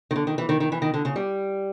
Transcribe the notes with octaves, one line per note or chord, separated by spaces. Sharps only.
D#3
D3
D#3
E3
D#3
D#3
E3
D#3
D3
C#3
G3